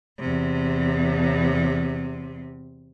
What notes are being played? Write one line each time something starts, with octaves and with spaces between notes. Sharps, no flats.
E2 C3